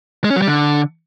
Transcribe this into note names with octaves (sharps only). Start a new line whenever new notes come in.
G#3
C#4
F#3
G3
D3